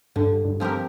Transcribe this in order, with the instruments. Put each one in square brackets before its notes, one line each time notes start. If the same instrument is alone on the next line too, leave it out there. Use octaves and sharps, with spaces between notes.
[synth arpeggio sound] G2 [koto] D3
[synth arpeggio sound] G2
[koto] F3 C4 G4 A#4